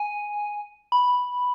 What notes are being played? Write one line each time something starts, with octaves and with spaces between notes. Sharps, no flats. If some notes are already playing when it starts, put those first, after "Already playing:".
Already playing: G#5
B5